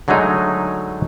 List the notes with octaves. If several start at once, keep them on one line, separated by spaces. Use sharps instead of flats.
D3 F#3 G#3 A3 D#4